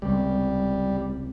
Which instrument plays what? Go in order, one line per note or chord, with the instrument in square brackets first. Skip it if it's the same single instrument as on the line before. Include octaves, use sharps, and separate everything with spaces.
[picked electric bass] C#2 C3 [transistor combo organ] G3